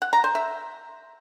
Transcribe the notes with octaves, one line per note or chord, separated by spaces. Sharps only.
F#5
A#5
C5
E5